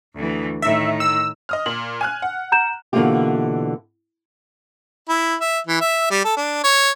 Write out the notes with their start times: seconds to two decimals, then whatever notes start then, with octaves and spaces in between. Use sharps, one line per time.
0.15 D2 E3
0.62 A2 D#3 E5
1.00 E6
1.49 D#5 D#6 F6
1.66 A#2 F#7
2.01 G#5 F6 F#6
2.22 F#5
2.52 A#5 G6 E7
2.93 B2 D3 E3 A#3 F4 G4
5.09 E4
5.40 E5
5.67 E3
5.81 E5
6.10 G3
6.24 A4
6.37 D4
6.64 C#5